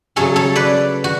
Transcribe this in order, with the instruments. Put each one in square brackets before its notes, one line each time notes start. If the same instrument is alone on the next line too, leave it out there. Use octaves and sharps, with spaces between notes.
[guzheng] C#3 F#3 A3 C#4 A4 C#5
A4 C#5
B4 D5
F#4